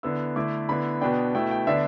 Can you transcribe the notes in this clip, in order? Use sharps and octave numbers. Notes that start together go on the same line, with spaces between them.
D3 B3 E4 E6
D3 A3 E4 D6
D3 B3 E4 B5
B2 B3 D4 G5
B2 A3 E4 G5
G5
D3 B3 D4 E5